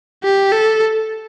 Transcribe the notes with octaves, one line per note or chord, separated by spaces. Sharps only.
G4
A4